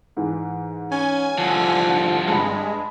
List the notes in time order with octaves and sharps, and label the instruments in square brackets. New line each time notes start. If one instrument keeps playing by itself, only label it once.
[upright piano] G#2 E3
[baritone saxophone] C#4 [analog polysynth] G#5
[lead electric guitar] C2 D3 [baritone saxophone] F3
[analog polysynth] G2 G#3 [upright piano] G#5 A5 B5